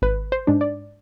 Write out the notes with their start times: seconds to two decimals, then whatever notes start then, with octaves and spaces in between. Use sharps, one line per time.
0.02 G#1 B4
0.32 C5
0.47 G#2 G#3 D4
0.61 D5